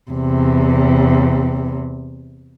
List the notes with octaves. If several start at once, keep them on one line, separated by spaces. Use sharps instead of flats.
E2 C3